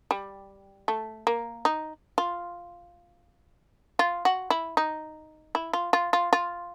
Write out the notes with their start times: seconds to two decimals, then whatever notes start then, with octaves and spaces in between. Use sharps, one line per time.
0.11 G3
0.88 A3
1.27 A#3
1.65 D#4
2.18 F4
3.99 F4
4.25 F#4
4.50 E4
4.77 D#4
5.55 E4
5.73 F4
5.93 F4
6.13 F4
6.33 F4